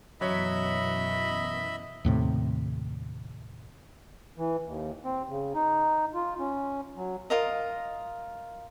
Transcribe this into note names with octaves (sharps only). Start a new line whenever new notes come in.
F#2 B2 E3 F#3 C#5 D#5 E5 B5
D#2 A2 C3
E3
D#2
C4
C#3
D#4
F4
C#4
F#3
F4 A#4 D#5